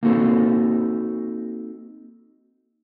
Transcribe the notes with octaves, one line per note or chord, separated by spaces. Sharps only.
A#3 C4 D#4 F#4 A4 C5